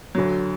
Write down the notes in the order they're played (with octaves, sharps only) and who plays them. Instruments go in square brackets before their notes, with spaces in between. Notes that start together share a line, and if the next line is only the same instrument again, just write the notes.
[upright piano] D2 D3 F#3